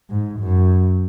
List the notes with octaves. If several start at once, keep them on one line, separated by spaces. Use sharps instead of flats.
G#2
F#2